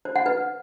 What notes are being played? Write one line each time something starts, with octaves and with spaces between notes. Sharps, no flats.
C5
F#5
B4